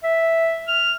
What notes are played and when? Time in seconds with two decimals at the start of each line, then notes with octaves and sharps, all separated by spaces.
0.04 E5
0.68 F6